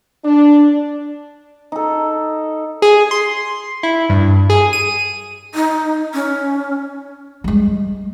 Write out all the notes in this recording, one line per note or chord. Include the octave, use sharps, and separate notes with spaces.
D4
D#4 A4
G#4
C6
E4
G2
G#4
D#7
D#4
C#4
G3 G#3